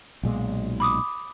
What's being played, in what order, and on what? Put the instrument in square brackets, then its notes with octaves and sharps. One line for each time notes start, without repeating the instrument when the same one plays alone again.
[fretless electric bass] B1 A#2 G#3
[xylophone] B5 D6 D#6